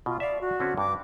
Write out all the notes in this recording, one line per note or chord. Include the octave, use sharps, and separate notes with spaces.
B2 F4
D5 E5 F5
F#4
D3 C4 C#4
G2 D6